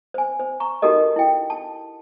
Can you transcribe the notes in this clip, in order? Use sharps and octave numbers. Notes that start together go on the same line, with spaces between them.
C5 G#5
C5
A#5 C#6
D#4 F#4 G4 A4 A#4 D#5
E4 G5
A5